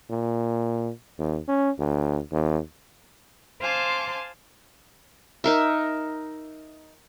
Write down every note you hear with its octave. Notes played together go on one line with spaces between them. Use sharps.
A#2
D#2
C#4
D2
D#2
C5 F5 G#5 A5 C6 D6
D#4 A#4 E5